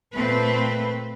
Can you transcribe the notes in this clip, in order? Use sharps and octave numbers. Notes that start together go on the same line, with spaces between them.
A#2 A3 C4 B4